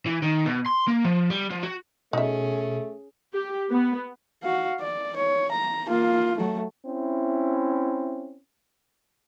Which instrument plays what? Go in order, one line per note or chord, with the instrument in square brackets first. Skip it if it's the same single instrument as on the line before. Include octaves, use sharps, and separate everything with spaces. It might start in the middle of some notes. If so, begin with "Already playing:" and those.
[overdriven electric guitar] E3
D#3
B2
C6
A#3
F3
G3
F3
F#4
[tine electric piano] B2 [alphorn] A3 [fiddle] C#4 G#4 [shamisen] D#4 E5
[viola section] G4
B3
[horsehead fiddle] F#4 F5
D5
C#5
A#5
A#3 F4
F#3 A3
[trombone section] C4 C#4 E4